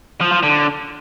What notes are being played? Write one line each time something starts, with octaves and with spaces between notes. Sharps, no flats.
F3
F3
D3